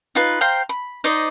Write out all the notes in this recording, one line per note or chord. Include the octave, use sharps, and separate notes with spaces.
D#4 F4 B4
C5 F5 G5 A#5
B5
D#4 C5 D5 D#5